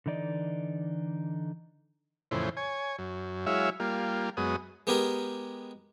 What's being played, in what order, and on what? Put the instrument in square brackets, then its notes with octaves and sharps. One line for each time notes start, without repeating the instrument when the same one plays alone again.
[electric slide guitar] D3 E3 D#4 D5 D#5
[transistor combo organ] F2 A2 C#3 E3 C5
C#5 G#5
F#2
F#3 G#3 E4 C#5 E5 F5
G3 A#3 F4
F#2 G#3 B3 D#6
[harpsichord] G#3 B3 G4 G#4 A#4